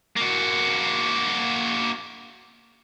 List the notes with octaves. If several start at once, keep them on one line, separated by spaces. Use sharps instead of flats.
A#3 F#4